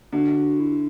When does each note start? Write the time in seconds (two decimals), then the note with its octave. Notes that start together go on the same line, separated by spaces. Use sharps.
0.12 D3 F#4
0.60 E4